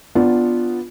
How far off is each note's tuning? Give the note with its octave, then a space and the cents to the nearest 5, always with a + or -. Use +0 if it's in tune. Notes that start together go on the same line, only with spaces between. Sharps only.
B3 +0 D4 -5 F4 +0